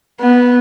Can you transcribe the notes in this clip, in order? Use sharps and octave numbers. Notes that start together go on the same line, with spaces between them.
B3